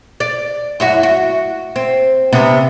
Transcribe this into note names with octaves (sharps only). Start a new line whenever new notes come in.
D5
F#2 E4 F#4
F#4
C4
C3 B3 D4